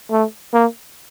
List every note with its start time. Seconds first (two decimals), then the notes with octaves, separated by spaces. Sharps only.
0.11 A3
0.53 A#3